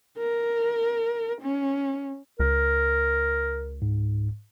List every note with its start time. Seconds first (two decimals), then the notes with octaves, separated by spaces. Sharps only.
0.18 A#4
1.41 C#4
2.40 C#2 A#4
3.82 G#2